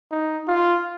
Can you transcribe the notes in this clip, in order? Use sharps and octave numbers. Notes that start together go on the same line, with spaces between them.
D#4
F4